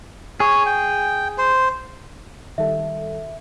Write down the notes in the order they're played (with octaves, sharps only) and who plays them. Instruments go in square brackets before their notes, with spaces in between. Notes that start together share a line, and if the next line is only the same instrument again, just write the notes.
[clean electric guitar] G#4 [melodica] C#5
[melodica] G5
C5
[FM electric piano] D#3 G3 A4 [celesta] E5